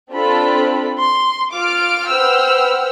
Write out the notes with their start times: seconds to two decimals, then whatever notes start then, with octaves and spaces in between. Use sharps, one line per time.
0.12 C4 D4 F4 A4 B5
0.98 C6
1.53 F4 D6 F6 D7
2.08 B4 C5 F#5 G5 E6 F6